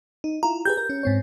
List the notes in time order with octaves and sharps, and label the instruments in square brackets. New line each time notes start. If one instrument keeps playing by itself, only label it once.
[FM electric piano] D#4
[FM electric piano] E4 F4 [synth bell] A#5
[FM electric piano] G4 G#4 B4 [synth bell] G6
[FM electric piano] A#4
C#4
G#2 C4 C#5